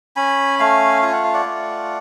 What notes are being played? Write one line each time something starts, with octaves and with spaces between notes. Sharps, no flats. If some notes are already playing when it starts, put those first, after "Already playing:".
C#4 G#5 B5
A3 F5 G#5
F4 G#5
F#5
F5
D5 F#5
A3